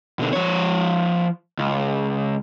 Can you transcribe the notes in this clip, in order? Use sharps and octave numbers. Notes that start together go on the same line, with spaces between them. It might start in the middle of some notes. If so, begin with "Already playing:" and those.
B2 D3
F3 C#5
C#2